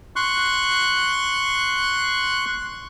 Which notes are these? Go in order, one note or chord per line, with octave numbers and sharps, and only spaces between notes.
C6 C#6 F#6